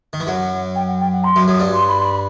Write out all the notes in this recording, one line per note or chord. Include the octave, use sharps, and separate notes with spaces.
D#3
E3
F#2 F#3 F#5
G5
F#5
G5
F#5
C6
F#2 F#3
F#2 F#3 D#6
G2 G3
C6
B5
C6
B5